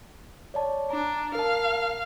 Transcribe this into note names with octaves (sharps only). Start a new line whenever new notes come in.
C#5 D5 A5
D4 A#5
A#4 F5 A5